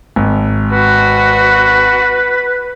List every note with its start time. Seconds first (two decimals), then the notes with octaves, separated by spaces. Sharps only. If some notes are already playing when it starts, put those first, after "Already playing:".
0.16 G#1
0.72 F#4 B4